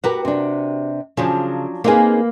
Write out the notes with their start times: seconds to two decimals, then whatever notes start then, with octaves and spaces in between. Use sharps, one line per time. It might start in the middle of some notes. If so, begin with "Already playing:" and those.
0.04 F#4 G4 A#4 B4
0.25 C3 D4
1.17 C#3 F3 F#3 D4
1.84 A#3 C4 D#4 G#4 B4